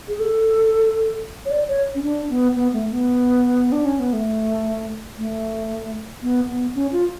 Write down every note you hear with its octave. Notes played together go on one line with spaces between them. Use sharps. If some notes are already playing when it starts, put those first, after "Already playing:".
G#4
A4
C#5
D5
C#5
C#4
D4
B3
B3
A3
B3
D4
C#4
B3
A3
A3
B3
B3
C#4
F4